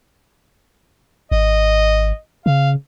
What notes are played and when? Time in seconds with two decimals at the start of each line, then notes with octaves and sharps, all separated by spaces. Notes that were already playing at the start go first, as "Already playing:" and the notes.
1.31 G#1 D#5
2.46 C#3 F5